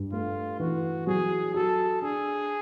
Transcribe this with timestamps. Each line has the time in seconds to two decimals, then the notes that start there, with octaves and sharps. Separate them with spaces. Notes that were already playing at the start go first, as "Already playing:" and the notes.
Already playing: G2
0.12 A3 F4
0.60 E3 F#4
1.07 F#3 G#4
1.54 F#4 A4
2.02 D4 G#4